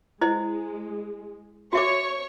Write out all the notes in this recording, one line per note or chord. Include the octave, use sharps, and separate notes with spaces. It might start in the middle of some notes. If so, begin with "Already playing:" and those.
G#3 E4 C5 D#5
F#4 C#5 E5 C#6 D6